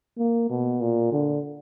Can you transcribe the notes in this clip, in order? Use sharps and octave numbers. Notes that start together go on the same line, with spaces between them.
A#3
B2
A#2
D3